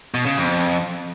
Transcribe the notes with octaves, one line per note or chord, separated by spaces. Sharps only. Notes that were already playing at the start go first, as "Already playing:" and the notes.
B2
C#3
F2